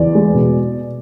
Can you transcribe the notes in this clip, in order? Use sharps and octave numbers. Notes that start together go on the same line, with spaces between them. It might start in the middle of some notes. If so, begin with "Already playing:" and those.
Already playing: E2 D5
G#3
B2